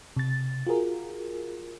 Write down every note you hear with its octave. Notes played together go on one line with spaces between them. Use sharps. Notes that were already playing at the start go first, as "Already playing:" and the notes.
C3 A6
F4 F#4 G#4 A#4